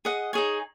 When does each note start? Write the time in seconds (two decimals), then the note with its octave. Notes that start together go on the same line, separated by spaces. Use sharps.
0.05 G#4 D#5 F#5
0.33 D#4 G#4 C#5 G#5